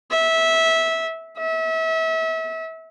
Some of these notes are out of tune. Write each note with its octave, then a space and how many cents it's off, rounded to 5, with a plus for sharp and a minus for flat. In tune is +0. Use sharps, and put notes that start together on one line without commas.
E5 -15
E5 -30